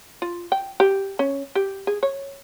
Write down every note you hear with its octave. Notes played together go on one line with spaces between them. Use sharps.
F4
G5
G4
C#4
G4
G#4
C#5